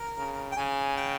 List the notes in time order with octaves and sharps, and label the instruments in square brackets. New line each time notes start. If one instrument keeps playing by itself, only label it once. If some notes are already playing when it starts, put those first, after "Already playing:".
Already playing: [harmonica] A#4
[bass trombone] C#3
[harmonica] G5
[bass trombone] C#3 [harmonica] G#5
[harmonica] G5